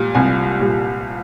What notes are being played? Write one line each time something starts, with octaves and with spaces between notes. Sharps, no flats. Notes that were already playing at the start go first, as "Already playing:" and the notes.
Already playing: A#2 G3
C2 G#5
A#2 G3